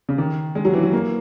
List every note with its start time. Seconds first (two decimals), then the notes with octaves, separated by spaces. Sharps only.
0.09 C#3
0.18 D#3
0.55 G#3
0.65 F#3
0.74 E3
0.83 F#3
0.93 A#3